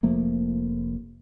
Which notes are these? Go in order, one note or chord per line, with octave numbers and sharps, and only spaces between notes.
F1 F3 A3 A#3